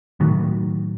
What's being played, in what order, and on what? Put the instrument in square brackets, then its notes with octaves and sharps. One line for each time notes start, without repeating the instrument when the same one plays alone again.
[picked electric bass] A2 D#3 F#3